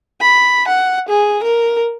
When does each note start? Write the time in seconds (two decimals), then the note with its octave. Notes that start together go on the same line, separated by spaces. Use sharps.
0.21 B5
0.68 F#5
1.09 G#4
1.44 A#4